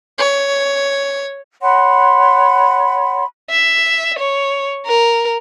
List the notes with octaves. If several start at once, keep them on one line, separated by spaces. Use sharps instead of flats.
C#5
C#5 F#5 B5 C6
E5
C#5
A#4